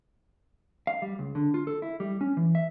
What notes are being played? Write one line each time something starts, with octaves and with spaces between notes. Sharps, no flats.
F5
G3
C#2
D3
F4
A4
E4
G3
C#4
E3
E5